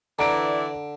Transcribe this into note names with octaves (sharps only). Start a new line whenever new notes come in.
D3 E3 D5 A#5 D7